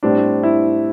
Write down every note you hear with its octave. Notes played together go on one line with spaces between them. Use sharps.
A2 G3 C4 D4
E4